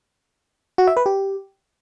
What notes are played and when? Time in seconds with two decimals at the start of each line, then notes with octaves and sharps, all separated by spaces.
0.78 F#4
0.87 E5
0.97 B4
1.06 G4